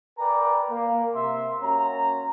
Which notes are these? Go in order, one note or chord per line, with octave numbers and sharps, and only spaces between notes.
A#4 B4 D5 G5 G#5 A#5
A#3
C3 E5 C6
A#3 C#4 F#4 A#5